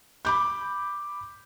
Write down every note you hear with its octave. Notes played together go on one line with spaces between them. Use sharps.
B5 D6 G6